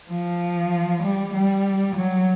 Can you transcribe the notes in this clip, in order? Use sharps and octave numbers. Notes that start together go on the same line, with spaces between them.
F3
G3
G3
F#3